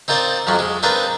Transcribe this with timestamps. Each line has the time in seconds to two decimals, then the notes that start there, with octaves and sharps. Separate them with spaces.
0.08 C4 D#4 F4 A#4 C5 D5
0.47 B1 F2 F3 F#3
0.59 G#3
0.83 C4 D4 D#4 F4 A#4 B4